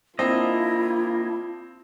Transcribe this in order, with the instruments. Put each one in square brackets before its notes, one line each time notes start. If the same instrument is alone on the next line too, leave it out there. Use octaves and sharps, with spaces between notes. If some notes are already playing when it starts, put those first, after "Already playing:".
[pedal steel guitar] A#3 D4 D#5 [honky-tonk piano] C4 [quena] E4 [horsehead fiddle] F4